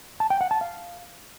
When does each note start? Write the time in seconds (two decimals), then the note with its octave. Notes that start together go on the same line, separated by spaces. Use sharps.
0.20 A5
0.30 G5
0.41 F#5
0.51 A5
0.61 F5